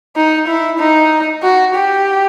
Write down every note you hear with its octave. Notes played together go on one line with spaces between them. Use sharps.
D#4
E4
D#4
F#4
G4